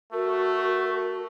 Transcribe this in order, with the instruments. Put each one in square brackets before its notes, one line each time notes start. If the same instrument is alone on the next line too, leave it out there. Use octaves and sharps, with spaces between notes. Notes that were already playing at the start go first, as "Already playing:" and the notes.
[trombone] A3 [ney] F#4 [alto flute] A#4